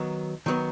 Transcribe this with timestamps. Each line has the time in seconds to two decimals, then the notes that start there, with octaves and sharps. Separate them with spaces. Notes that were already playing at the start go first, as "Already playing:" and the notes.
Already playing: D#3 F#3 B3
0.46 D#3 F#3 B3